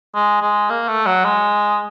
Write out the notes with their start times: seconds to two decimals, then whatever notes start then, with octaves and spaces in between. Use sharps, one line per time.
0.15 G#3
0.42 G#3
0.70 A#3
0.88 A3
1.06 F#3
1.25 G#3